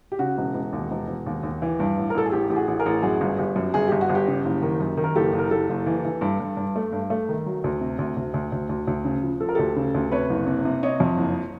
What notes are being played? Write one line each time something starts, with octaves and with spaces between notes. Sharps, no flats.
G4
C#3 F#4
E1
E1
D#2
E1
E1
D#2
D#2
E3
G2
A1
A#4
A1 A4
G#4
A1 G4
A1 G4
F#4 G#4
A1
G#4 A#4
A1
F#2 F#4 G#4
G1
G1 G4
F#2
G1 G#4
G1 G4
F#4
G1
G4
C#3
F#1
D#3
F#2
D#3
A#4
F#1 G4 A4
F#1
A#4
F#1 G4 A4
F#1
E3
E3
G2
G2
G2
A3
G2
A3
D#3
F#3
D2
C3
D2
D2
D2
D2
D2
D2
C#3
F3
F3 A4
A#4
D2 G4 A4
C#3
D2
C3 B4 C#5
F#1
C3
C3
C3 C#5 D#5
F2
F#1